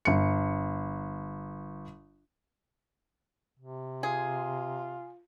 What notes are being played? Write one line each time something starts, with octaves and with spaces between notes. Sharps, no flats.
G1 C#7
C3
F4 G#4